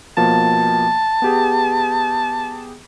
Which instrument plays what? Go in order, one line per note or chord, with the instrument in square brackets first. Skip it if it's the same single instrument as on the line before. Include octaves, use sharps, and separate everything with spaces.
[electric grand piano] B2 F3 A#3 [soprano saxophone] A5
[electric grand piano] B3 G4 G#4